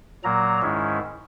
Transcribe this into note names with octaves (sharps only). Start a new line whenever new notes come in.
A#2 F#3 A#3 A#5
G#2 D#3 G#3 C#4 E4